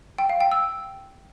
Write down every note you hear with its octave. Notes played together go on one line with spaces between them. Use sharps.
G5
F5
G5
E6